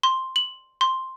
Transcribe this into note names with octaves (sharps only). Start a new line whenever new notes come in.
C6
F#7
C6